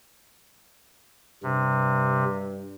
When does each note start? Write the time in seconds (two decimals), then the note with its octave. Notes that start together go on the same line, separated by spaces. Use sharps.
1.43 G2 C3